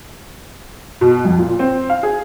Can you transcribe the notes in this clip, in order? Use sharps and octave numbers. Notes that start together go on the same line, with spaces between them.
B2
F2
A#2
C4
F5
G#4